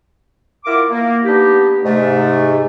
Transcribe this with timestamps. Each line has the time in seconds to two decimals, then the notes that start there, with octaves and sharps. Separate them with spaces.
0.65 E4 F4 A#4 F#5 D6
0.90 A#3
1.25 B3 D4 D#4 G4
1.84 G#2 C3 A3